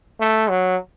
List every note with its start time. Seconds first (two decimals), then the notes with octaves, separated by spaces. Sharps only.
0.20 A3
0.49 F#3